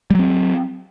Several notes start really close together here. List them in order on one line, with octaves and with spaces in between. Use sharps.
G3 F#3 C4